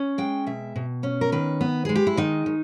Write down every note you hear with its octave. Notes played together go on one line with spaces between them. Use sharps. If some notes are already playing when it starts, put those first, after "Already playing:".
Already playing: C#4
G#3 G5
B2 E5
B2
C#4
A#4
D#3 B4
B3
G#3 G#4
G4
E4
D#3 D#4
D#3